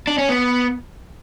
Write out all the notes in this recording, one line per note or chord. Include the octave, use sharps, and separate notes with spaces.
D4
C#4
B3